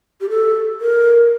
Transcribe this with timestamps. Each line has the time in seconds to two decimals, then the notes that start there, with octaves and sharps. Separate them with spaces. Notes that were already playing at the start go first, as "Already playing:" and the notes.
0.21 G4
0.30 A4
0.81 A#4